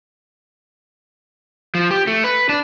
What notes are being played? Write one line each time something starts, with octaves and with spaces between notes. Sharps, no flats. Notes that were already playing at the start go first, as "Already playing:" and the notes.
F3
G4
A3
B4
D4